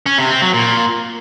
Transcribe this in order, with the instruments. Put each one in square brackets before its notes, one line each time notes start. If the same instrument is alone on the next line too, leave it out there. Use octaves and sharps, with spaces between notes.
[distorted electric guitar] C#4
C3
C4
F#3
A#2